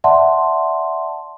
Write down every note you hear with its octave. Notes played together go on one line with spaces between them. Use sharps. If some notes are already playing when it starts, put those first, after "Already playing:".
D5 E5 F#5 A5 C6